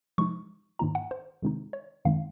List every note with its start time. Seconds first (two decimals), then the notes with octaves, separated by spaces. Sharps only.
0.18 C3 F3 G#3 D#4 C#6
0.79 G#2 D#3 A#3 F4 A#5
0.95 F#5
1.11 C5
1.42 C3 D#3 G#3 C4 D#4
1.73 C#5
2.05 F#2 D#3 G#3 C4 D#4 F5